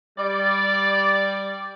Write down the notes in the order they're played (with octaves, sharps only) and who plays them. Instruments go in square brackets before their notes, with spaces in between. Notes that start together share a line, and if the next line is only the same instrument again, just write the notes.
[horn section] G3 D5